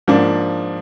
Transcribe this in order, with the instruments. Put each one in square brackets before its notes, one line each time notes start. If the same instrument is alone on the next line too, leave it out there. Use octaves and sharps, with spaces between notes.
[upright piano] G#2 F3 A#3 D4